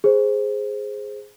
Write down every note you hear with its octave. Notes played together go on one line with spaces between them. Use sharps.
G#4 C5